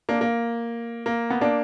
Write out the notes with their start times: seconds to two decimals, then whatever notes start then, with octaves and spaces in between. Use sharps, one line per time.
0.09 A#3 D4
0.21 A#3
1.06 A#3
1.30 B3
1.41 A#3 D4